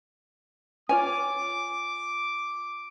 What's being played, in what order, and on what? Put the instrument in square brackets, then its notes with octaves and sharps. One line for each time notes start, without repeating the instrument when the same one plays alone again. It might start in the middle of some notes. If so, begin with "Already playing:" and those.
[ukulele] F4 C#5 G#5 [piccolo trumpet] D6